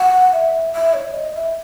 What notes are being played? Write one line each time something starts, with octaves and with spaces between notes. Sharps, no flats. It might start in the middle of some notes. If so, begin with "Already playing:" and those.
Already playing: F#5
E5
E5
C#5
D#5
E5